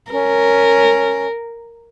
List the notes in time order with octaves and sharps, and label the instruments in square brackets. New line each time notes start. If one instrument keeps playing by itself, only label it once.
[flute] C#4 [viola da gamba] A#4